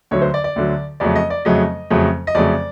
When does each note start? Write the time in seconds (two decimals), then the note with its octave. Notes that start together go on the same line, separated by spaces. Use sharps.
0.11 D2 D3 F#3 C#5
0.22 C5
0.34 D5
0.44 D5
0.56 D2 D3 F#3
1.00 F2 C#3 F#3 A3 D5
1.16 D#5
1.30 D5
1.45 F2 C#3 F#3 A3 D#5
1.90 F2 C#3 F#3 A3
2.27 D#5
2.35 F2 C#3 F#3 A3 D5